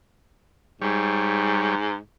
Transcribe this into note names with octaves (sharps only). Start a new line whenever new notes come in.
G#2 G3 C#5